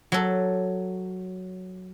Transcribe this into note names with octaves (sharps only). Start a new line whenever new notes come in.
F#3 A4